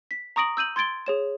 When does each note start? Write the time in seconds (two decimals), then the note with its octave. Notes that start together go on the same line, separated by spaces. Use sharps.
0.11 B6
0.36 A#5 C#6 D#6 A#6 D7 F#7
0.57 E6 G6 D#7 F#7
0.76 C6 G#6 A6 D7 G7
1.06 G#4 C#5 E7